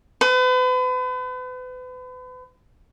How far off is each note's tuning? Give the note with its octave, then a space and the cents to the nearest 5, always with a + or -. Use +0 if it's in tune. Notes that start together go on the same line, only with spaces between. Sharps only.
B4 +40